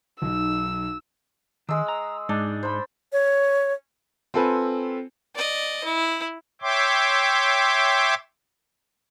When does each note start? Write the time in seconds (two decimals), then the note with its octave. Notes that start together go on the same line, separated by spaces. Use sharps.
0.22 B1 D#4 E6
1.69 D#3 G#3 E6
1.88 A#5
2.29 G#2 G#3 D4 D#4
2.63 C5 B5
3.12 C#5
4.34 C4 F4 A4 B4 G#5
5.36 D5 D#5
5.84 E4
6.62 C#5 E5 G5 C6 D6